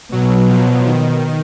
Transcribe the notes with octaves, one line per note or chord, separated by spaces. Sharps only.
B2 F#3
F3
D#3